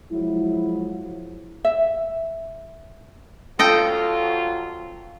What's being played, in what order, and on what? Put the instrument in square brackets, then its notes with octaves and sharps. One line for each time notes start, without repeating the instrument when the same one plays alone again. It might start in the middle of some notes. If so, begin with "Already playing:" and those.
[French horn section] F3 F#3 G#3 E4
[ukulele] E5
[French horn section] F2 F#3 F4 [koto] A4 D#5 G5